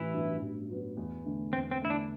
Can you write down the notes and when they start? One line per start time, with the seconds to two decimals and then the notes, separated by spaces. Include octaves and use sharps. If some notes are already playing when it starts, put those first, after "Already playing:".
Already playing: A1 E3 E4
0.13 G2 F#3 B3
0.41 A1
0.70 G2 F#3 B3
0.97 E2
1.25 D3 A3
1.53 E2 C4
1.71 C4
1.81 D3 A3 E4
1.90 D4